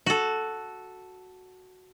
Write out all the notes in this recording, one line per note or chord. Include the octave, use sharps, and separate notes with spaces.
F#4 A4